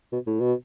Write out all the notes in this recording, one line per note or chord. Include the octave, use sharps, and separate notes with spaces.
B2
A2
B2